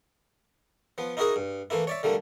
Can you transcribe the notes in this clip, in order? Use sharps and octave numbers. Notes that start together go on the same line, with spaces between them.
F3 B3
D#4 E4 F#4 G#4 A#4 D#5
G2
E3 A3 A#3 E4
C#5 D5 E5
D3 G3 A3 A#3